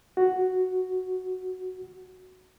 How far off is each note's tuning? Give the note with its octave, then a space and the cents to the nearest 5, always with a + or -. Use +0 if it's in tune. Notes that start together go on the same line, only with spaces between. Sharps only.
F#4 +0